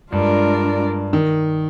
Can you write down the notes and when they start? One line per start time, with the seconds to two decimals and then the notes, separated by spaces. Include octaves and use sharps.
0.12 G2 G#3 D4 F4 A#4 D5
1.13 D#3